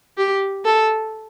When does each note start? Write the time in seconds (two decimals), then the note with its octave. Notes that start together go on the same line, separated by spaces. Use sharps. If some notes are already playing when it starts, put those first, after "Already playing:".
0.17 G4
0.65 A4